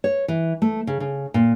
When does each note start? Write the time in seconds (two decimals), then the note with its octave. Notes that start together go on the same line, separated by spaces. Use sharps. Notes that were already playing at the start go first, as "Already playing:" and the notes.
0.04 C#5
0.28 E3
0.62 A3
0.87 C#3
1.00 C#3
1.34 A#2